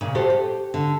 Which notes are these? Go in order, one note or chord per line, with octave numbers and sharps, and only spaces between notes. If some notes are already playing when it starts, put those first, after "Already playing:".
A#2 C#3
F#4 G4 A4 C5
G4
D3